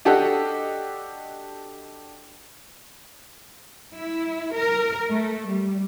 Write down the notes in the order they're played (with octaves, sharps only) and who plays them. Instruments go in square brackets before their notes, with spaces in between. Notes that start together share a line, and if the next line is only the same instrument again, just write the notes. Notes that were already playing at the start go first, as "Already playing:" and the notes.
[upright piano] D4 F#4 G4 A4 D#5 F#5
[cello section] E4
A#4
A3
G3